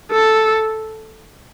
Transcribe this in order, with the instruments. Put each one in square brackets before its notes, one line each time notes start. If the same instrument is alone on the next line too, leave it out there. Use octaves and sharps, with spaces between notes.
[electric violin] A4